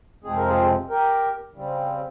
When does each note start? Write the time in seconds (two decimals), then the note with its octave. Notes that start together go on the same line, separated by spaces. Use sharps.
0.24 F2 C3 F3 G#3 C4 G#4
0.37 A#4
0.48 F4 G#4
0.89 G4 A#4
1.55 C#3 G3 C4